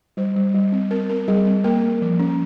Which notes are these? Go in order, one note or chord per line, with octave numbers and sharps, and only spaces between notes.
G3 C5
G3
G3
C4
C4 A#4
C4 A#4
G3 G#4
C4
A#3 A#4
A#3
F3
C#4